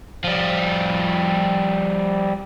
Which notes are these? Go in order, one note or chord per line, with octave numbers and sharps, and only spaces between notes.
F3 G3